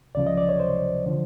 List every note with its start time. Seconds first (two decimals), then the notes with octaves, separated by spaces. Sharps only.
0.15 C#2 C#3 F3 D5
0.27 D#5
0.37 D5
0.49 C#5
0.60 C5
1.06 D3 F3